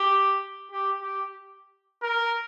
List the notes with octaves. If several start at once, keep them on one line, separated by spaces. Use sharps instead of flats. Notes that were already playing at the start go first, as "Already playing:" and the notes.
Already playing: G4
G4
G4
A#4